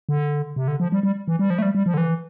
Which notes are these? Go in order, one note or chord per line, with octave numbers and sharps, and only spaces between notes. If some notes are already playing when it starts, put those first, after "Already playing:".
D3
C3
D3
F3
G3
G3
E3
G3
F3
A3
G3
G3
F3
D3
E3